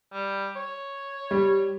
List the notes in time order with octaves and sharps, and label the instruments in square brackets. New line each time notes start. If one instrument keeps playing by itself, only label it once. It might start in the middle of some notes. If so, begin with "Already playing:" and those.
[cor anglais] G3
C#5
[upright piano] G3